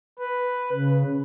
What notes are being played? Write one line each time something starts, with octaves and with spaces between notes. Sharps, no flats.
B4
C#3